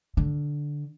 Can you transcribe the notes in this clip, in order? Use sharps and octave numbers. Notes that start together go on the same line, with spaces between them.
D3